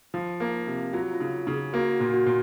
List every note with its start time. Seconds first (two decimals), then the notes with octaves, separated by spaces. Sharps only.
0.14 F3 F4
0.40 A#3
0.67 C3
0.93 F#3 F4
1.14 F4
1.20 C#3
1.47 C#3
1.53 G#4
1.73 A#3 F#4
1.94 F#4
2.00 A#2
2.14 F#4
2.26 A#2